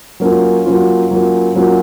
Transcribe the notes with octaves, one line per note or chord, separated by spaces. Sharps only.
F#3 A#3 C#4 F4
F#3 A#3 C#4 F4
F#3 A#3 C#4 F4
F#3 A#3 C#4 F4